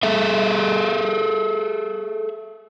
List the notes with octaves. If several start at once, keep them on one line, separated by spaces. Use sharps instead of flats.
G#4 A4 E5